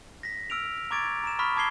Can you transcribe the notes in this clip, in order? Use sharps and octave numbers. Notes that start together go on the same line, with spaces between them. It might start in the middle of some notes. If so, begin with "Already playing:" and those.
A#6 B6
E6 F6 D7 F7
A#5 C#6 D6 G#6 A6 D7
A#5 E7
B5 C#6 D#6 F6 B6
A5 D6 G#6 C7 G7